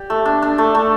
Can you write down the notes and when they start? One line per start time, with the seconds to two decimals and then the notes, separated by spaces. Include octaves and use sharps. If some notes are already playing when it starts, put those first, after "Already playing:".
Already playing: G4 D5
0.10 A3
0.25 D4
0.42 D4
0.58 A3
0.75 A3